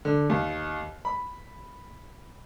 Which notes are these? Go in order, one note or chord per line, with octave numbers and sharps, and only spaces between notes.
D3
D#2
B5